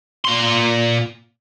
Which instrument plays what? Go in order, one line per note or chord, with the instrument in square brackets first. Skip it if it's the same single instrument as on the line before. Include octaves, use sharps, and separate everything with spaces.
[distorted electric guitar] A#2 C6